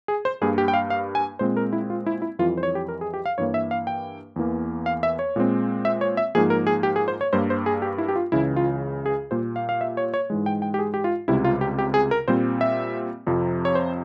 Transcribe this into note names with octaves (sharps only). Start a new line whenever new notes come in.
G#4
C5
G2 G3 A#3 G#4
G4
G5
F5
F5
G#5
A#2 G#3 C4 C5
A#4
E4
F4
E4
E4
F2 E3 G3 F4
C5
C#5
G4
A#4
G#4
G4
F5
G2 E3 A#3 C#5
E5
F5
G5
E2 E3 A#3
F5
E5
C#5
A#2 G#3 C4
E5
C#5
E5
G#2 F3 A#3 G#4
A#4
G#4
G4
G#4
C5
C#5
G2 G3 A#3 C5
C5
G#4
G4
E4
G4
F4
C#2 C#3 E3 E4
F4
G#4
A#2 G3 A#3 C5
F5
F5
E5
C#5
C#5
G#2 E3 G#3
G5
G5
G4
G#4
G4
F4
C#2 C3 G3 E4
F4
G4
G4
G#4
A#4
A#2 G3 C4 C5
E5
F2 C3 F3
C#5
C5